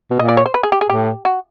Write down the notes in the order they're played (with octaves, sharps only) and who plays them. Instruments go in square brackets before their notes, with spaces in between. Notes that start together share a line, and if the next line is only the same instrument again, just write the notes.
[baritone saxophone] B2
[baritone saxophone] A#2 [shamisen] D#5
[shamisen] D5
C#5
C5
B4
G#4
G4
G#4
[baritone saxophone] A2 [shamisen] G4
[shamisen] F#4